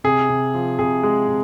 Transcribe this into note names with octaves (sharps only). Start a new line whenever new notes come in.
C3 G#4
C3
F3
C3 G#4
G#3
C3